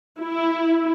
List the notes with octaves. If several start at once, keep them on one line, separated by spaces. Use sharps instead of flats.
E4